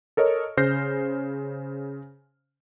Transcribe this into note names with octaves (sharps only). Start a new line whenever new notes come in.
A4 A#4 C#5 D#5
C#3 C5 F6 G6 A#6 C7